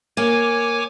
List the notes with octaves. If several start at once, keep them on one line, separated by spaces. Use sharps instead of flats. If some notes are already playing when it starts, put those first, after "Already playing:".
A#3 C#5 G#5 D6